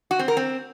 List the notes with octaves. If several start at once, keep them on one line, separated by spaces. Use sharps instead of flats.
F#4
C4
A#4
C4